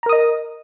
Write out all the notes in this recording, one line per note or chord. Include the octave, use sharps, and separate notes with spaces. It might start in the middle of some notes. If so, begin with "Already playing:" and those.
A#4 D#5 A#5 D#6